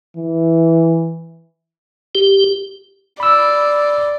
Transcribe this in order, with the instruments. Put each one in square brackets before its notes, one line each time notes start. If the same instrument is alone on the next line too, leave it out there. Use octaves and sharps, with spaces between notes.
[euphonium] E3
[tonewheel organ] G4
[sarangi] D5 [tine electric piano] B5 E6